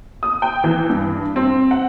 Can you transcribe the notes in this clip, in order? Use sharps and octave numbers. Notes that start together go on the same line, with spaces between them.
D#6
G5
E3
G2
C4
F#5